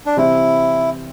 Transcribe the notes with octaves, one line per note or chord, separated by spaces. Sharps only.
D4
C3 E3 G3 C4 E4